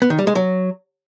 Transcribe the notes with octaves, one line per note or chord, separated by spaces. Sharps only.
B3
D#3
G3
G#3
F#3